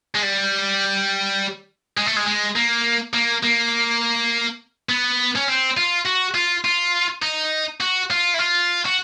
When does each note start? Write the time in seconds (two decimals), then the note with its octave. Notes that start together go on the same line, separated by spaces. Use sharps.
0.15 G#3
0.22 G3
1.97 G#3
2.06 A3
2.16 G#3
2.26 G#3
2.56 A#3
3.14 A#3
3.43 A#3
4.89 B3
5.36 C#4
5.48 C4
5.77 F4
6.06 F#4
6.35 F4
6.65 F4
7.22 D#4
7.80 F#4
8.11 F4
8.34 E4
8.39 F4
8.86 F#4